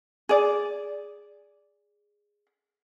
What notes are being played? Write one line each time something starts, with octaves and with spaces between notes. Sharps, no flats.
G#4 D5